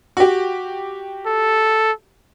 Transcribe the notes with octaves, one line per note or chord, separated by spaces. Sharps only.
F#4 G4
A4